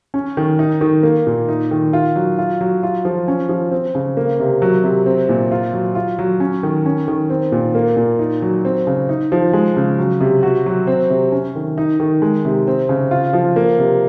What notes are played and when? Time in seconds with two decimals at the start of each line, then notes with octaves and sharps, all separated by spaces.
0.14 C#4
0.37 D#3
0.59 D#4
0.81 D#3
1.03 A#3
1.27 A#2
1.49 D#4
1.71 D#3
1.93 F4
2.16 F#3
2.39 F4
2.61 F#3
2.83 F4
3.05 F3
3.28 C#4
3.49 F3
3.72 C4
3.95 C#3
4.17 A#3
4.40 C3
4.62 F#3
4.84 C3
5.06 C4
5.29 A#2
5.52 F4
5.73 F#3
5.95 F4
6.19 F#3
6.40 C#4
6.63 D#3
6.86 C#4
7.08 D#3
7.30 C4
7.52 A#2
7.75 A#3
7.96 A#2
8.19 D#4
8.42 F#3
8.65 C4
8.87 C#3
9.09 D#4
9.32 F3
9.53 G#3
9.77 C#3
9.99 F#3
10.20 C3
10.43 F#4
10.66 F#3
10.87 C4
11.10 C3
11.32 C#4
11.56 D#3
11.78 D#4
12.00 D#3
12.22 G#3
12.45 C3
12.67 C4
12.89 C#3
13.11 F4
13.33 F3
13.56 A#3
13.79 C3